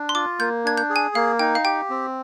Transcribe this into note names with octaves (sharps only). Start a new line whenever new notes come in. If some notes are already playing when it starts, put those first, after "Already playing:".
Already playing: D4
C6
F4 D6
A#3 G6
D4 G#6
G6
G#4
G#5
A#3 F5
D#4 G5
F5
G4 G5
C4